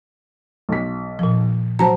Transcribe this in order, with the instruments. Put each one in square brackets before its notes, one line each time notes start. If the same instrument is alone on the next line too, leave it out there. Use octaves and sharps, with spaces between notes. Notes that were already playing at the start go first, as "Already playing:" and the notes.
[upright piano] B1 B6
[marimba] A#2 F3
[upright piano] F#3 [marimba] C5 A5 A#5